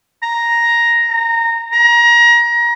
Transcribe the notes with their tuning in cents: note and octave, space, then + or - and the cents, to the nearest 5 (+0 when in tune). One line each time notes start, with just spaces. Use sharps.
A#5 +5
A#5 -20
A#5 +25